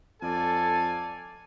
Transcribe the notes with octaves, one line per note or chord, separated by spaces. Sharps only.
F2 A4 D5 F5 G#5